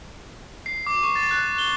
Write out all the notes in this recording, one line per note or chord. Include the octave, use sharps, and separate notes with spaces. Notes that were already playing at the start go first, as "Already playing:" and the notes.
C7
D6
C#6
A6
F#6
G7